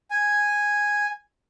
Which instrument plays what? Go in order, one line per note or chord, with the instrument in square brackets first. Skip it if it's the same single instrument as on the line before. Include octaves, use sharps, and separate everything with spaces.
[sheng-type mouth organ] G#5